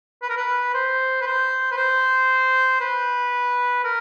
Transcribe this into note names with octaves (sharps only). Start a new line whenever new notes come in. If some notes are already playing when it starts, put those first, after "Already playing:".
B4
A#4
B4
C5
B4
C5
B4
C5
B4
A#4